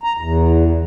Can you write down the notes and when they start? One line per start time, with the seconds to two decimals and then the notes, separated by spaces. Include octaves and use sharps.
0.03 A#5
0.17 E2